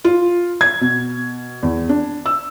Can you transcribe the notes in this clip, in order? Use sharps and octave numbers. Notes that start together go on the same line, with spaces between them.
F4
G#6
B2
E2
D4
E6